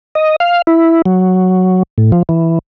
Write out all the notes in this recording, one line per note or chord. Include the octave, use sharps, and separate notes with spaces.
D#5
F5
E4
F#3
A2
F3
E3